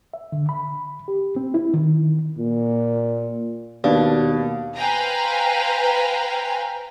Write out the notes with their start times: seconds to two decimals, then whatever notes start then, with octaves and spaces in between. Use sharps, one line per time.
0.14 E5
0.32 D3
0.49 B5
1.08 G4
1.36 C4
1.54 E4
1.74 D#3
2.38 A#2
3.84 D#2 B2 D4 F5
4.76 B4 C5 F5 G5 G#5 A#5